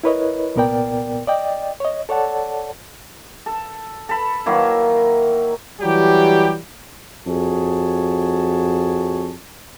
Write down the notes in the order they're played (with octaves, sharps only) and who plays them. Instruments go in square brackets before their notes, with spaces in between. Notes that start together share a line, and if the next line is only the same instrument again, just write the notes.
[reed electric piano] E4 A#4 B4 C#5 D#5
C2 A#2 B3 A#4 D5 G5
D5 D#5 G5
C#5 D#5
A4 C#5 D5 F#5 A5
[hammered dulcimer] A4
A4 B5
D#3 F#3 A#3 E4
[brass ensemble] E3 F#3 G3 G4
F2 F#4 G#4 C#5 A5